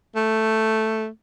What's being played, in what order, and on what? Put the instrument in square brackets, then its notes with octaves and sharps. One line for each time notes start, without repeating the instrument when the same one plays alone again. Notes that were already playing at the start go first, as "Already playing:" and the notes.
[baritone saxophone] A3